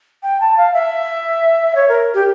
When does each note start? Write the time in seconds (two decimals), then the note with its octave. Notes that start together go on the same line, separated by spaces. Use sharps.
0.23 G5
0.40 A5
0.57 F5
0.74 E5
1.75 C#5
1.88 A#4
2.14 G4